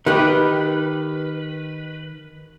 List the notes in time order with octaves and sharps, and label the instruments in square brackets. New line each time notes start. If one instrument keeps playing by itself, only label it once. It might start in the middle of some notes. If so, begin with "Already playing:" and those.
[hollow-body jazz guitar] D#3 G4 [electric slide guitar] B4